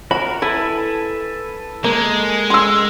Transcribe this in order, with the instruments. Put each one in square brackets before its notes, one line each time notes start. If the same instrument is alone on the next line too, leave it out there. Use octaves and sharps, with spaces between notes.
[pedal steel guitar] F#4 A#4 [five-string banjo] B5
[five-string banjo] E4 [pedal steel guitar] A4 B4 G#5
[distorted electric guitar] G#3 [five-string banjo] A#3
[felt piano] C6 E6